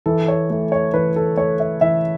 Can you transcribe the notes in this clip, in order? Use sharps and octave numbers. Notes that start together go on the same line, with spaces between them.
E3 A4
C#5
A3
C#5
E3 B4
A4
A3 C#5
E5
E3 E5